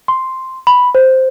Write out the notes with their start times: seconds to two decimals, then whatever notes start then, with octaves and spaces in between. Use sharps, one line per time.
0.08 C6
0.67 B5
0.95 C5